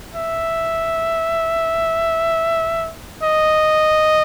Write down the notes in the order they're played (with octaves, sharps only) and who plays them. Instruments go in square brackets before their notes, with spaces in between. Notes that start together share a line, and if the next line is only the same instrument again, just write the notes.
[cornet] E5
D#5